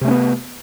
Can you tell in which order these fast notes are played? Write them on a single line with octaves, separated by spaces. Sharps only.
C3 A3 C#4 B3